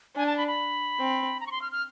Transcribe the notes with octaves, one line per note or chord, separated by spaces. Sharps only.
D4 G#5
A5
B5
B5
C4
A#5
C#6
C6
F6
F6